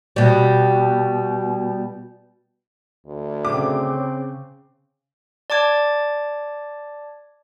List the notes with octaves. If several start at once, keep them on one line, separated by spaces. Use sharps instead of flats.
B2 G3
D2
C#3 C4 D6
D5 A5 D6 G#6